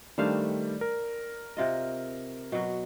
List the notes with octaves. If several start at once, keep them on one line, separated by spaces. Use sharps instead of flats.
D#3 G3 A3 D4 C5 F5
A#4
C3 F4 D#5
B2 F#3